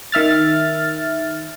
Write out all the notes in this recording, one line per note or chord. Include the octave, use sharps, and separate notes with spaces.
D#3 E5 F6 A6